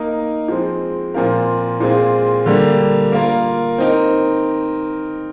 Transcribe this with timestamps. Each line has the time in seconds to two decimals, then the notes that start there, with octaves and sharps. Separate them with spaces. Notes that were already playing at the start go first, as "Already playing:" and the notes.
Already playing: A#3 D#4 A#4 D#5
0.48 F3 G#3 C4
1.14 A#2 F3 C4 F4 A#4
1.80 A#2 G#3 C4 F4 G#4
2.46 D3 G3 A#3
3.12 A#3 F4 A#4
3.78 C4 D#4 A#4